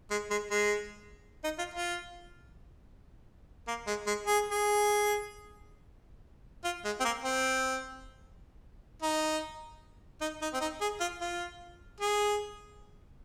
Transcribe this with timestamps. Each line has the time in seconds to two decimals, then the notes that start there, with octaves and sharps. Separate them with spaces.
0.10 G#3
0.30 G#3
0.50 G#3
1.44 D#4
1.58 F4
1.74 F4
3.68 A#3
3.87 G#3
4.06 G#3
4.27 G#4
4.50 G#4
6.64 F4
6.84 G#3
7.00 C4
7.05 A#3
7.24 C4
9.02 D#4
10.21 D#4
10.42 D#4
10.53 C4
10.61 D#4
10.81 G#4
11.00 F4
11.21 F4
12.00 G#4